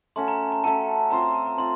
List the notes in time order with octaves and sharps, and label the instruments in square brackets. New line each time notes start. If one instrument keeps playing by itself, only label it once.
[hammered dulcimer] A3 C#4 F#4 A4 [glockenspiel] C6
[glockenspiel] A#5
A#5
[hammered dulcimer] A3 C#4 F#4 A4 [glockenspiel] A5
[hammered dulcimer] C4 F4 C5 [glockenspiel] A#5
[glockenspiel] A#5
A5
A#5
[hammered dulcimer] C4 F4 [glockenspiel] C6